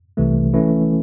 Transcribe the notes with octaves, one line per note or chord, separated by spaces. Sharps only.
C2 C3 E3 A3
E3 A3 C#4 E4